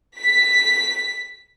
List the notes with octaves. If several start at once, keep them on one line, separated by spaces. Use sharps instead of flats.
B6